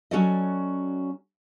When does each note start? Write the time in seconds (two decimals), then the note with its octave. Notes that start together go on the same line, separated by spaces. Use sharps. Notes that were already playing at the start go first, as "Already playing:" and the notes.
0.11 F#3 C#4 F#4 A4 D5 D#5